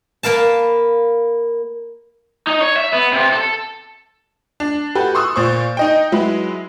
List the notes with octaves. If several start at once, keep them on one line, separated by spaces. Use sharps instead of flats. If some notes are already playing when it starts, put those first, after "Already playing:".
A#3 B4 F5 A5
D#4
C#5
E5
B3
C3
A4
D4
F#4 G4 A4 B4
C6 C#6 D#6 E6 F#6
A#2 C5 C#6
D#4 D#5 G5
F#3 G#3 E4 B4